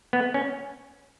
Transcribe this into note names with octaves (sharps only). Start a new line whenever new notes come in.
B3
C#4